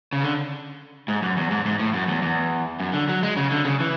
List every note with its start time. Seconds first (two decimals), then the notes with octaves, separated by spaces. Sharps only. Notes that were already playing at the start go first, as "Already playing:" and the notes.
0.13 C#3
0.23 D3
1.08 G#2
1.22 F#2
1.37 E2
1.51 G#2
1.66 G#2
1.79 A2
1.94 F#2
2.08 E2
2.22 E2
2.80 F#2
2.94 D3
3.09 F#3
3.23 G#3
3.37 C#3
3.51 D3
3.65 C#3
3.80 E3